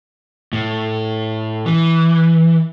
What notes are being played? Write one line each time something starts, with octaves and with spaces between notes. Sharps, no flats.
A2
E3